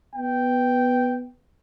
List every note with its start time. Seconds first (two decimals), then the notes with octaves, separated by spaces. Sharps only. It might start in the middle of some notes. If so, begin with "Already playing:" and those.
0.15 B3 G5